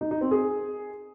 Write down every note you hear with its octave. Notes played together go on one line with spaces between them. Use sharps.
D#4
D#4
C4
G#4